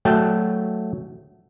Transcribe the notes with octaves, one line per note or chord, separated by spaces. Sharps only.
F#3 A3 G5 A5